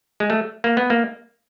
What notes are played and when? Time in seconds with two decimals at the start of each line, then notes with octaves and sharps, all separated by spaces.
0.20 G#3
0.30 A3
0.64 A#3
0.77 B3
0.90 A#3